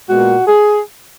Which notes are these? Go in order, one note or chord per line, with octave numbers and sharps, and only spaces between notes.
A#2 G#3 B3 F#4
G#4